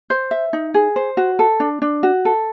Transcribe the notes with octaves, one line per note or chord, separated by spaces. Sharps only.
C5
E5
D#4
G#4
C5
F#4
A4
D4
D4
F#4
A4